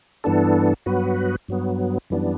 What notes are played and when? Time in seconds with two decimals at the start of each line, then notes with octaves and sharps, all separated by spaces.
0.24 G2 E3 B3 D4 A4
0.86 G2 F#3 B3 F#4 B4
1.48 G2 F#3 B3
2.10 F#2 E3 G3 B3 D4